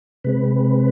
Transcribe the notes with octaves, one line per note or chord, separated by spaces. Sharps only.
C3 G#3 C4 B4